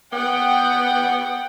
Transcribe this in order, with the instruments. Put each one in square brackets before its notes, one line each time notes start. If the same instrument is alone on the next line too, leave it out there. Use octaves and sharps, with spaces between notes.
[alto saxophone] B3 [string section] F#5 G5